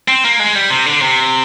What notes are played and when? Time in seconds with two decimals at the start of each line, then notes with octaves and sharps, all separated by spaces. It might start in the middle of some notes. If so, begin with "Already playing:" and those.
0.08 C4
0.24 A#3
0.40 G#3
0.55 G3
0.70 C3
0.86 D3
1.02 C3